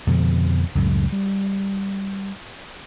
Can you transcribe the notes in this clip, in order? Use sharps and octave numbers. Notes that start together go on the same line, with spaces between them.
F2 B2 D3 F3
C#2 F#2 A2
G3